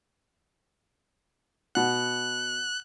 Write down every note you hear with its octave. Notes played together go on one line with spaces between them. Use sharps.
B2 F#5 F#6